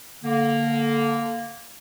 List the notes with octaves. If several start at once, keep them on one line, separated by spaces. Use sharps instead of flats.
D3 A#3